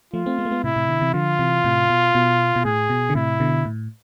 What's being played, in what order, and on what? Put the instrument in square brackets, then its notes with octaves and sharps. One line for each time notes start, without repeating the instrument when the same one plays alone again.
[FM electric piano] F3 A3 [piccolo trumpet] F4
[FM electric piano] A3 C4
G#3 B3
A3
G#3 B3
[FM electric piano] A2 C3 [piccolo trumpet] E4
[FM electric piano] A2 C3
B2 D3
C3 E3
[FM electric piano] D3 F3 [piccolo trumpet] F4
[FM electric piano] C3 E3
A2 C3
B2
B2
B2
[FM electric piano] A2 [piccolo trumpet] G#4
[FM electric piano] B2
D3
[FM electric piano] A2 C3 [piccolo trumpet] E4
[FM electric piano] B2 D3
A2